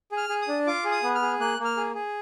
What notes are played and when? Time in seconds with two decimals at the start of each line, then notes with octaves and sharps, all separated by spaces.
0.12 G#4
0.17 F6
0.29 G#4
0.42 D#6
0.48 D4
0.67 F4 D6
0.85 G#4
0.92 D#6
1.03 B3
1.15 F6
1.22 G#4
1.40 A#3 F#6
1.59 A#3
1.65 F6
1.77 G#4
1.95 G#4